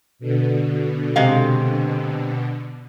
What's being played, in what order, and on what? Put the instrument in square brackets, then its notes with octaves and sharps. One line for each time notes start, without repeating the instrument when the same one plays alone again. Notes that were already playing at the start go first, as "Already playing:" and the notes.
[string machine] B2 D3
[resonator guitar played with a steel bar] C3 G#3 F5